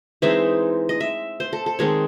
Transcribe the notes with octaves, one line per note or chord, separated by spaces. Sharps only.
E3 G#3 C4 D#4 E5
D#5
E5
C5
A4
A4
D#3 G#3 C4 C#5